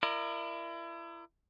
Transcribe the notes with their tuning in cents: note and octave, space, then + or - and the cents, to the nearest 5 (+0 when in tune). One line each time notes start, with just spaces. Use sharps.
E4 +35 A#4 +0 D5 +45